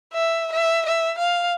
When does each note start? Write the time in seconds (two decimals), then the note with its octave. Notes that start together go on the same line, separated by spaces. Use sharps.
0.13 E5
0.52 E5
0.85 E5
1.18 F5